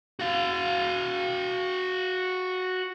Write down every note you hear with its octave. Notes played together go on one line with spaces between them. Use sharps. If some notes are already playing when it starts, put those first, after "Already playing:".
F#4 F5